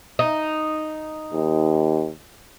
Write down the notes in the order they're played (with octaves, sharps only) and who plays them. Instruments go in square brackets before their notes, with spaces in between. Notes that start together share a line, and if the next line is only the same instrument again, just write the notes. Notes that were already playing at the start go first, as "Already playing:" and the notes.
[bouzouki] D#4
[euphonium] D#2